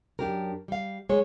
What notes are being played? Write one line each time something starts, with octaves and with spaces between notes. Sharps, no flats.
F#2 D4 G4 A#4
G3 F5
F#2 G#3 C#5